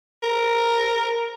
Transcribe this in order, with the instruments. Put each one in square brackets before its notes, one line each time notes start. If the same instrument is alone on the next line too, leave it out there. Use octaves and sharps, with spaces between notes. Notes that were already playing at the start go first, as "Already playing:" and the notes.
[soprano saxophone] A#4